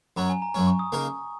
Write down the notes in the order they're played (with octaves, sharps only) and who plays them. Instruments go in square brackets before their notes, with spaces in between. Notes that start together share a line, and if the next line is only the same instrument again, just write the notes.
[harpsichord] F#2 F#3 C#4 [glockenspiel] A#5
[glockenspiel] G#5
A#5
[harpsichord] F#2 F#3 C#4 [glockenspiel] A#5
[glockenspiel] C#6
D#6
[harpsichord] C#3 A#3 D#4 A#4